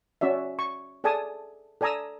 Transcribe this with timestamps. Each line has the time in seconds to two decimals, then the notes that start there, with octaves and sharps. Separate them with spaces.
0.21 C#4 F#4 D5 E5
0.59 C#6
1.04 G#4 A4 D5 G#5 A5 D#6
1.81 A4 D5 G#5 A#5 D#6 E6